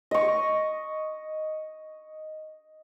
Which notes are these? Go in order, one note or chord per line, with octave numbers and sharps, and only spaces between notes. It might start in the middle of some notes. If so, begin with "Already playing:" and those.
D#5 C#6